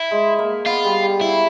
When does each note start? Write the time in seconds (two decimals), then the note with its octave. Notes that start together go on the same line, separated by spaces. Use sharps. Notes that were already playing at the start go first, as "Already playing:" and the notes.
Already playing: E4
0.11 G#3
0.39 A#3
0.66 B3 F4
0.85 G3
1.03 G3
1.21 F#3 E4